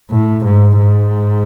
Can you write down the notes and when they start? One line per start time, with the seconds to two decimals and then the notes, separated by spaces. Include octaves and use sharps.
0.11 A2
0.45 G#2
0.79 G#2